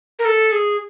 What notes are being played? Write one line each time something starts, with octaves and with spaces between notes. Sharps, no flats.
A#4
A4
G#4